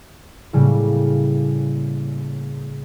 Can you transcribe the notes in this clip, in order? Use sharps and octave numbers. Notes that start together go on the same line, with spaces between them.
A2 C#3 G3 A#3